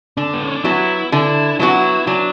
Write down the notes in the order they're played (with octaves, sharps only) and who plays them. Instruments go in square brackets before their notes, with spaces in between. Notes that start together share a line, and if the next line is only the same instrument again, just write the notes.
[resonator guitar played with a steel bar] D3 [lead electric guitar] D4
[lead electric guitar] B3
C#4
D4
[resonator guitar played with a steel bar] F#3 B3 F#4 [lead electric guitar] E4
[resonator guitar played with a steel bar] D3 [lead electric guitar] E4
[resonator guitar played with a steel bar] F#3 B3 F#4 [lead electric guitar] E4
[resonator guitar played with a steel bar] F#3 [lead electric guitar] D4